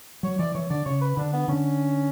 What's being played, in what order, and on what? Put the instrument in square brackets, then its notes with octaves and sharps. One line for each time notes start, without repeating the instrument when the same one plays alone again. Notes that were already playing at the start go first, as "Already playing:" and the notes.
[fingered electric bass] F#3 [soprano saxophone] C#5
[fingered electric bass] E3 [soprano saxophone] D5
[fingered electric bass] E3 [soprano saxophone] C#5
[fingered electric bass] D3 [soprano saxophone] D5
[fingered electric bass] C#3 [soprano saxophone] C#5
[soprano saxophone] B4
[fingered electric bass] D3 [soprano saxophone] D4
[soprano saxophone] B3
[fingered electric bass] D3 [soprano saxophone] C#4